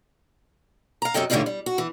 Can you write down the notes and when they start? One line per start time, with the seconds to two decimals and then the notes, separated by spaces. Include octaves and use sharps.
1.02 F5 A#5
1.14 F#2 C3 F#3 A4 D#5 G5
1.30 A2 D3 E3 G3 D#4 F4
1.46 G3
1.66 F#4
1.78 E3